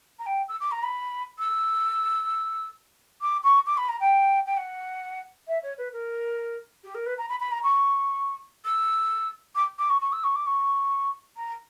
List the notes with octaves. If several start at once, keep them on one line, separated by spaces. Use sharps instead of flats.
A#5
G5
E6
D6
A#5
B5
E6
D6
C#6
D6
B5
A#5
G5
G5
F#5
E5
C#5
B4
A#4
G4
A#4
B4
A#5
B5
B5
A#5
C#6
E6
D6
D6
C#6
C#6
E6
C#6
D6
C#6
A#5